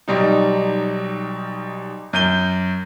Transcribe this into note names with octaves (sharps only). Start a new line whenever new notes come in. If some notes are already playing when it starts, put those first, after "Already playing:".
B1 G3 D#4
F#2 G6 D#7 G7